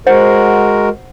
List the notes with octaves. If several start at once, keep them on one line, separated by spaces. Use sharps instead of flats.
G#3 F#4 A#4 C5 F#5